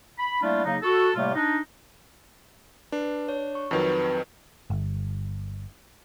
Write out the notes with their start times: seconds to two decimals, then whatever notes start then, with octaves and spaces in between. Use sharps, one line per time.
0.19 B5
0.42 G3 A3 A#3 D4 E4 F4
0.65 C#3 F#3 A#3 D#4
0.82 F#4 A4
1.15 A2 C3 G3 A3 A#3 F4
1.34 D4 D#4
2.92 D4 B4
3.29 C#5
3.55 C#6
3.71 F2 D#3 F#3 C4 B4
4.70 G1